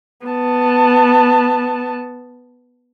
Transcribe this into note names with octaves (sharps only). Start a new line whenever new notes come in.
B3 A5